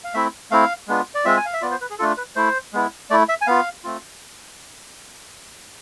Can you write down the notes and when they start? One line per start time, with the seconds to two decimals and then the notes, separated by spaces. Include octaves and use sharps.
0.04 F5
0.14 A3 C4 E4 E5
0.51 A3 C4 E4 F5
0.88 G#3 B3 D4 F4
1.15 D5
1.25 G#3 C4 F4 E5
1.37 G#5
1.45 F5
1.54 E5
1.62 B3 F4 D5
1.71 C5
1.81 B4
1.90 G#4
1.99 A3 D4 F4 A4
2.17 B4
2.36 A3 E4 C5
2.73 G#3 B3 E4
3.10 A3 E4 D5
3.29 E5
3.41 G#5
3.47 B3 F4 F5
3.84 A3 C4 F4